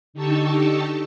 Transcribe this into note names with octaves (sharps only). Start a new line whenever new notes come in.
D3 D#4 G4 A5 C#6 E6